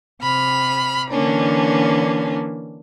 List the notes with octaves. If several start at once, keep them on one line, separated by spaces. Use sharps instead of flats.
C3 B5 F6
D3 E3 A#3 C#4 D4